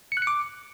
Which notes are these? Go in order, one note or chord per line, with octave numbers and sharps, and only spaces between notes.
C#7
F#6
C#7
D6